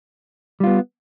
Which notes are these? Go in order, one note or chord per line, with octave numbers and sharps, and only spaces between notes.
G3 B3 F4